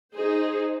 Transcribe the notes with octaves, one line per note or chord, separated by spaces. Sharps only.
D#4 G#4 C5